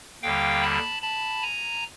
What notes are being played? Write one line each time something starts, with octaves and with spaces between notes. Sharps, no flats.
D#2 D3 G3 F5 G5
A5 B5
A5 B5
G#5 A#5